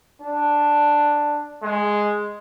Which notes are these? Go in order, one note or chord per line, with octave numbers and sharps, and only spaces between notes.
D4
G#3